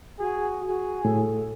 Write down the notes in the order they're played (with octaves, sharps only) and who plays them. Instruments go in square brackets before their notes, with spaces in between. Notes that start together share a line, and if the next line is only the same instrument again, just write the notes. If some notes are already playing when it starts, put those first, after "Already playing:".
[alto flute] F#4 [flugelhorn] G#4
[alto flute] F#4 [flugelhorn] G#4
[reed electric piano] A2 [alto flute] A4